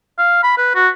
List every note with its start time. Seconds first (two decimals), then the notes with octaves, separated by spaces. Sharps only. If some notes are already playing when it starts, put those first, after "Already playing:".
0.18 F5
0.43 B5
0.58 B4
0.76 F#4